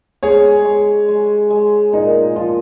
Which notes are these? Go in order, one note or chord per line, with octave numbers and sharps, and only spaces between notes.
G#3 G#4 C#5
G#3
G#3
G#3
A#2 D#4
F3 F4